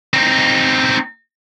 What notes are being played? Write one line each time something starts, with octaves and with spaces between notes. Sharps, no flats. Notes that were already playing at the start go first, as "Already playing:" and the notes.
C4 D#4